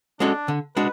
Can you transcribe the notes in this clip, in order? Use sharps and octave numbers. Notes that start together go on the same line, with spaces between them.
G#3 C#4 D4 F#4 A4
D3
G#3 D4 F#4 B4